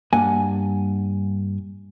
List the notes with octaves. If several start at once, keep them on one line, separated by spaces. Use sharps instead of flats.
G2 A#3 F#5 G#5